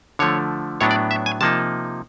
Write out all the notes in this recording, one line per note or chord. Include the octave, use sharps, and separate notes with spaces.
D3 F3 A3 C#5
A2 F#3 B3 D4 C#5
D5
E5
G#5
C3 F3 A#3 D#4 A5